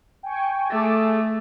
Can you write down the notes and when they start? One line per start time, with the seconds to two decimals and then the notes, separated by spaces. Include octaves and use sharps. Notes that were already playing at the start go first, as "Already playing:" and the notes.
0.23 G5 G#5 C#6
0.70 A3 G#4 A4 D6